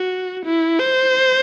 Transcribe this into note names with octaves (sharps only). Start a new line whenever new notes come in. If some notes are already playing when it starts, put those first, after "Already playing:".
Already playing: F#4
E4
C5